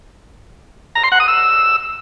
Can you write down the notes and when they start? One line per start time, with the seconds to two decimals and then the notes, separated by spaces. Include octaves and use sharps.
0.95 A#5
1.04 C6
1.12 F#5
1.20 D#6
1.28 E6